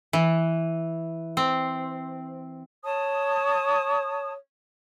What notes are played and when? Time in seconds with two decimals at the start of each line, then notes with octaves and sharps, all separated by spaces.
0.13 E3
1.37 C4
2.83 C#5 A5 D#6